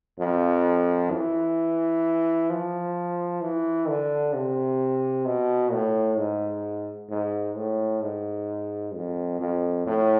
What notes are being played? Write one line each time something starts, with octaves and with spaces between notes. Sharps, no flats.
F2
E3
F3
E3
D3
C3
B2
A2
G#2
G#2
A2
G#2
F2
F2
A2